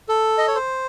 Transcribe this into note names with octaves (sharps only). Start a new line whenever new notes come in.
A4
D#5
C#5
C5